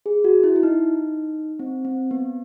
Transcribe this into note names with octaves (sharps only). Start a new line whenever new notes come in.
G#4
F#4
E4
E4
D#4
C4
C4
B3